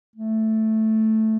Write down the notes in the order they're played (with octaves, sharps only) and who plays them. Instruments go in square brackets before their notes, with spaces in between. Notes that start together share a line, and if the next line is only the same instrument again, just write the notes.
[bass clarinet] A3